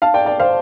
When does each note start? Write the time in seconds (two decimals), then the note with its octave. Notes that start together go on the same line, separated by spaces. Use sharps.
0.02 F5 A5
0.14 D5 G5
0.26 D5 G5
0.39 C5 F5